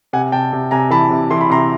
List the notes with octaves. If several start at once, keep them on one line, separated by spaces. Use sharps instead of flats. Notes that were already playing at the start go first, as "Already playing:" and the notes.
C3 F#5 G#5
C3 G5 A5
C3
C3 G#5 A#5
E3 A5 B5
C3
E3 C6
B5
C3 A#5 C6